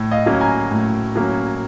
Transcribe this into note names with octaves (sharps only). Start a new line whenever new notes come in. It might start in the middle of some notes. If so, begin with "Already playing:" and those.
Already playing: A2
D#5 F5
F#3 A#3 C#4
G#5 A#5
A2
F#3 A#3 C#4